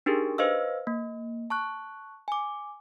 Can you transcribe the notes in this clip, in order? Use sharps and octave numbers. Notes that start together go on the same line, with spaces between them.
D4 D#4 G4 G#4 A#4
B4 C5 D#5 F5 E6
A#3
A5 C#6 F#6
G#5 D6